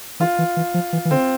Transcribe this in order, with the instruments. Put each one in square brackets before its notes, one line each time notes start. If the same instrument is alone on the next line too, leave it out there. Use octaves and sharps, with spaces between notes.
[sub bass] E3 [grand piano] F4
[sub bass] E3
E3
F3
E3
E3
[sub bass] D3 [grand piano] C4